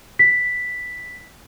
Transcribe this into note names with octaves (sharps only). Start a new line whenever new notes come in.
B6